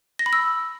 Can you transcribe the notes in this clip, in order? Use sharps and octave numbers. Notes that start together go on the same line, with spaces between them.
A#6
B5
E6